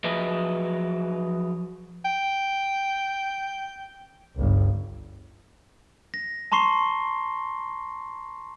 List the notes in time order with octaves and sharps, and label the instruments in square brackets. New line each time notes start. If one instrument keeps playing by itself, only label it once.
[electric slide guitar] F3 F#3 G#4 B4 D#5 E5
[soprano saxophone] G5
[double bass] G1 C#2
[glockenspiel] A#6
A5 A#5 C6 C#6 C7 G7